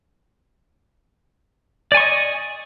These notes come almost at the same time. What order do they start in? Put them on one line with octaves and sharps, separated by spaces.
D5 G#5 C#6 D#5